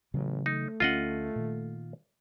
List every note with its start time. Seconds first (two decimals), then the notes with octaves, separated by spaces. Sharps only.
0.14 A1 C#3 E3 F#3
0.46 A3 D#4
0.80 D2 G3 C#4 F4 D#5 F#5
1.36 A#2 D#3